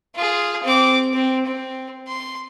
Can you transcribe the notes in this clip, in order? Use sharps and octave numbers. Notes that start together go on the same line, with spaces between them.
F4 G#4
C4 D6
C4
C4
C6